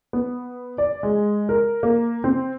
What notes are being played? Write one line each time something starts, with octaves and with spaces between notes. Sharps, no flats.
B3
D5
G#3
A#4
A#3
C4